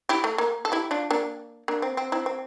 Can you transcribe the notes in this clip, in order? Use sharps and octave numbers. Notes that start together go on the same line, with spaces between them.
E4 G4
A3
A#3
A4
E4 G4
D4 F4
A#3 D4
A#3 D4
C4
C4
C4 E4
C4